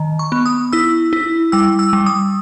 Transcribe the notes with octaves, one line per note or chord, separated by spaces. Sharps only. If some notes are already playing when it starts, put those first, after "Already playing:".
Already playing: D#3
C#6
B3
D#6
E4 E6
E4
G3 E6
E6
G3
D#6